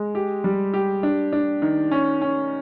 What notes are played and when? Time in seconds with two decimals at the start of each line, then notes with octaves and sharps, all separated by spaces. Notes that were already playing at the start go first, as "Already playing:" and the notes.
Already playing: G#3
0.15 G4
0.44 G3
0.73 G4
1.03 D4
1.33 D4
1.62 D#3
1.91 C#4
2.22 C#4